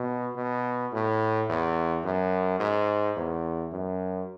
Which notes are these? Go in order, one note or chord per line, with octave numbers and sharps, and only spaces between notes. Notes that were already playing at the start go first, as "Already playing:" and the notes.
Already playing: B2
B2
A2
E2
F#2
G#2
E2
F#2